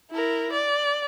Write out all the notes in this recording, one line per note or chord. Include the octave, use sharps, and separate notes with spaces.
E4 A#4
D5